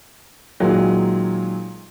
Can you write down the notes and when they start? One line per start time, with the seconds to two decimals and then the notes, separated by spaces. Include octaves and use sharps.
0.60 A#2 D#3 F#3 G#3